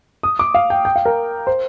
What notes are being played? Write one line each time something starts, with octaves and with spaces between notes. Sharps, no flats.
D#6
D6
F5
G5
G5
F5
A#4
C5